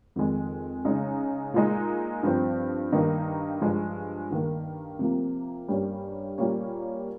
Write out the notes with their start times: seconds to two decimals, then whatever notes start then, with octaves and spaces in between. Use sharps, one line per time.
0.16 F2 D#3 G#3
0.85 C#3 G#3 D#4
1.54 A#2 G#3 D#4
2.23 G2 F3 C4
2.92 G2 D#3 A#3 D#4
3.61 G2 F3 G#3
4.30 G2 D#3 A#3
4.99 C3 F3 A#3
5.68 G2 G3 A#3 C#4
6.38 A#2 G3 A#3 C#4